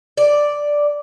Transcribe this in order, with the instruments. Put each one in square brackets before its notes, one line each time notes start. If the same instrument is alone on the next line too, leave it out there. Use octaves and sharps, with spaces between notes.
[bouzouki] D5